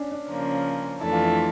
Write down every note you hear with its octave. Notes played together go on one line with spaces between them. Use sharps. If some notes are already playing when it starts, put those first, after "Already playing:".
Already playing: C#4 D4
D4
C#3 F3 A#3 C#4
F2 E3 A3 D4 E4 A4
F4
E4